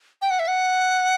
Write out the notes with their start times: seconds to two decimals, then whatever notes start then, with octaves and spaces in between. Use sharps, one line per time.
0.22 G5
0.30 F#5
0.39 E5
0.48 F#5